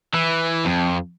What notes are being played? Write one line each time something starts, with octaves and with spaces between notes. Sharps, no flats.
E3
F2